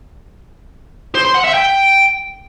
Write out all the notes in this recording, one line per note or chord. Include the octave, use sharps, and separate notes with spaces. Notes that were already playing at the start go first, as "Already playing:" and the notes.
C5
C6
F#5
E5
G5